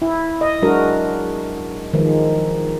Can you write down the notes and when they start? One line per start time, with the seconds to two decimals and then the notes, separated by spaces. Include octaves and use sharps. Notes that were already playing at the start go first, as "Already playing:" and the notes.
0.02 E4
0.41 D#5
0.62 F#3 G#3 D4 F#4 A#4
1.94 D#3 F3 G#3